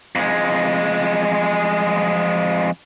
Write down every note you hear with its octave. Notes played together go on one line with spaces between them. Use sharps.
F2 G#3